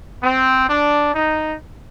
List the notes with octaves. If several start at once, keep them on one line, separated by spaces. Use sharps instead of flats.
C4
D4
D#4